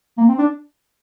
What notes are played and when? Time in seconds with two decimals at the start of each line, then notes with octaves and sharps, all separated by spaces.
0.18 A#3
0.29 C4
0.39 D4